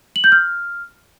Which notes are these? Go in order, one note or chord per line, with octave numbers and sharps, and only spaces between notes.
F#7
G6
F6